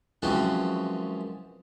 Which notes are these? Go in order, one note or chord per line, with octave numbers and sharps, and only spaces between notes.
F#2 E3 F3 G#3 C4 C#4